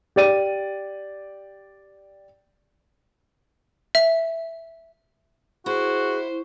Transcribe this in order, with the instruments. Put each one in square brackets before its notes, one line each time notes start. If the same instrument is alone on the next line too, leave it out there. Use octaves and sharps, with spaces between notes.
[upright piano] G4 D5 D#7
[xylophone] E5
[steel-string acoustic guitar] E4 [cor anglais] F#4 [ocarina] G#4 [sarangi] C5